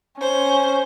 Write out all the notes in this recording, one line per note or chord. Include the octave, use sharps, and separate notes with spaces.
C#4 C5